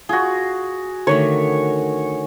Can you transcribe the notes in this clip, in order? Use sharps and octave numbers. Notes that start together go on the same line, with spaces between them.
F4 F#4 G#4
D3 D#3 A3 C#5